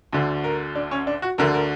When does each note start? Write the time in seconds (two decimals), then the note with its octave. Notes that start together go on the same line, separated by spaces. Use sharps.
0.13 D2 D3
0.44 A#4
0.75 D4
0.91 C#4
1.07 D4
1.22 F#4
1.38 D2 D3 A#4
1.54 A#4